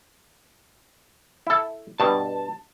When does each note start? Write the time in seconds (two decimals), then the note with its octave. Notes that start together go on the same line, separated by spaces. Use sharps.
1.47 E4 A4
2.00 G2 B2 A5